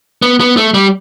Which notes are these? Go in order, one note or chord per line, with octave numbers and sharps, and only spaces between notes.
B3
B3
A3
G3